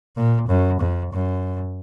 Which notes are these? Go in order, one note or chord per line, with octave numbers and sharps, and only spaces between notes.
A#2
F#2
F2
F#2